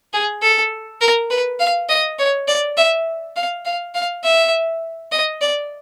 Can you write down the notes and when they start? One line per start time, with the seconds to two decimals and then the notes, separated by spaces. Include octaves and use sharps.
0.13 G#4
0.42 A4
1.01 A#4
1.31 B4
1.60 F5
1.89 D#5
2.19 C#5
2.48 D5
2.77 E5
3.36 F5
3.65 F5
3.95 F5
4.24 E5
5.12 D#5
5.41 D5